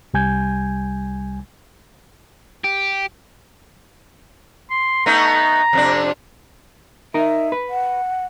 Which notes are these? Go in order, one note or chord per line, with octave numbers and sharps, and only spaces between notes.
C2 G3 G#5 G6 G#6
G4
C6
A3 B3 D#4 A#5
F2 C3 D4
D#4 A#4 E5
B4
F#5